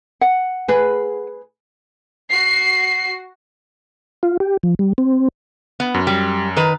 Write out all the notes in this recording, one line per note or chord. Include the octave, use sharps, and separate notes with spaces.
F#5
G#4 B4
F#4 C7
F4
G4
F3
G3
C4
B3
F#2
G3
D#3 B4 A#5